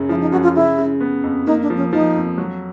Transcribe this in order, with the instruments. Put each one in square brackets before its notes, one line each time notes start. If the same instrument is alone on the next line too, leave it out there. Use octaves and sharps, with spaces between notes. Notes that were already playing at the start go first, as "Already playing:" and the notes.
Already playing: [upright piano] F#2 C#3
[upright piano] F3 [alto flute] E4
[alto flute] D#4
[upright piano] F#2 [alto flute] F#4
[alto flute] F4
[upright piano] C#3 [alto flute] E4
[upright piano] C#3
B3
F2
[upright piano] A#3 [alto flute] D#4
[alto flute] D4
[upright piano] F3
[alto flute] C#4
[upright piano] F3 [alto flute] D#4
[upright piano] F2
F#3